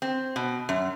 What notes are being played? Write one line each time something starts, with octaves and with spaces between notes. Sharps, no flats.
C4
B2
F#2